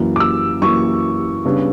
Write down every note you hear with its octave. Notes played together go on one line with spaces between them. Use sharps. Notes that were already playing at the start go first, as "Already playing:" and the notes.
Already playing: F#2 E3 A#3
D6
E6
F#2 E3 A#3 C#6
C#3 G3 B3 D4